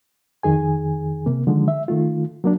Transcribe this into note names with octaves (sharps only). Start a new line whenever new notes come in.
F2 D#3 G#4 G#5
C3 A#3
D3 D#3 F3 G#3
E5
D#3 A3 F4
F#3 A#3 D4